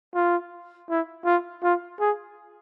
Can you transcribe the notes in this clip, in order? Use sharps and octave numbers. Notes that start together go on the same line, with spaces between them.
F4
E4
F4
F4
G#4